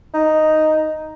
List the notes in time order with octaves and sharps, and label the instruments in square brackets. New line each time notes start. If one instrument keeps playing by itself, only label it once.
[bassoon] D#4